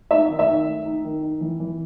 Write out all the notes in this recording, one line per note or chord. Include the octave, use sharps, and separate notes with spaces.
D#4 E5
D#3
E5
D#3
A3
D#4
D#3
D#4
E3
E3